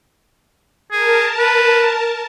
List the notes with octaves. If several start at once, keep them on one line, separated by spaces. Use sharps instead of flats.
G#4 A#4 A5
B4